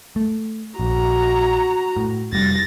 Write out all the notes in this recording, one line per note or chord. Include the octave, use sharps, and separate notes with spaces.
A3
A#1 F#4 A#5
A2
F1 G3 A6 A#6